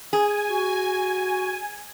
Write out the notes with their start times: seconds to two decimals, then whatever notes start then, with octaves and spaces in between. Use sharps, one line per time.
0.13 G#4 G#5
0.49 F#4